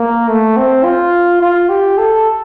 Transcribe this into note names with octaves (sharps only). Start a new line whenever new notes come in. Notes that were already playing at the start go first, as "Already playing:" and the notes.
Already playing: A#3
A3
C4
F4
F4
G4
A4